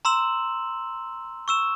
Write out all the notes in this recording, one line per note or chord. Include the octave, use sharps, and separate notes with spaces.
A#5 C6 E6 E7 F#7
C#6 E6 E7